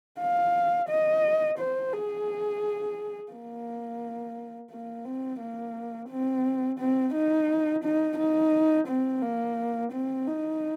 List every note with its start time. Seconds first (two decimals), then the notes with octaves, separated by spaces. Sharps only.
0.19 F5
0.89 D#5
1.58 C5
1.93 G#4
3.32 A#3
4.71 A#3
5.05 C4
5.40 A#3
6.10 C4
6.79 C4
7.14 D#4
7.84 D#4
8.18 D#4
8.87 C4
9.22 A#3
9.92 C4
10.27 D#4